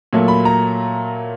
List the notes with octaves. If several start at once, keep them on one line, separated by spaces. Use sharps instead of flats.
A#2 F#3 A3
B5
A#5